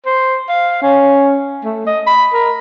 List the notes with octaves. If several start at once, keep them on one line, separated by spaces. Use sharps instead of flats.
C5
F5
C#4
A3
D#5
B5
A#4